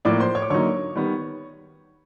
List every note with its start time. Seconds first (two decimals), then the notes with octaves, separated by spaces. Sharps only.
0.05 A2 F3 A#3 D5 D6
0.20 C5 C6
0.35 C#5 C#6
0.42 D6
0.50 D3 F#3 A#3 D#4 C#5 C#6
0.95 D#3 G3 B3